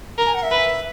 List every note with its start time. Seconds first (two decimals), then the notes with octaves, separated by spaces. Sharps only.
0.18 A#4 A#5
0.27 G#5
0.34 F#5
0.43 E5
0.51 B4